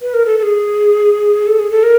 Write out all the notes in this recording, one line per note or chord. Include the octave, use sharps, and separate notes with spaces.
B4
A#4
A4
A4
G#4
A4
G#4
A4
A#4